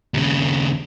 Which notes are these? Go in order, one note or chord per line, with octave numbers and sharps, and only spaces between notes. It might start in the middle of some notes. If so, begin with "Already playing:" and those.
D#2 C#3